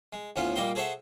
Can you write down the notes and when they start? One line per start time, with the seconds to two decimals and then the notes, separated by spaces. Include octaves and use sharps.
0.13 G#3
0.36 D2 A2 B3 C#4 F4
0.56 A#2 G3 A#3 D#5 G5 C6
0.75 G#4 A4 C5 C#5 E5 F#5